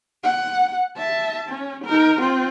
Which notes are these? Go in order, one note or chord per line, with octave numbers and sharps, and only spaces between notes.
F#5
E5 A5
C#4
D#4 A#4
C4 F4